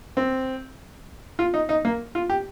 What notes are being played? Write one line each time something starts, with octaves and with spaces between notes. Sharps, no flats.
C4
F4
D#4
D#4
A#3
F4
G4